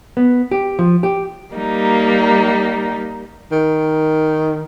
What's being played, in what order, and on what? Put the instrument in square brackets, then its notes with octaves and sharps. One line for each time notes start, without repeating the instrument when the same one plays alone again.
[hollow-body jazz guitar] B3
G4
F3
G4
[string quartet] G3 A#3 D#4
[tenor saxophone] D#3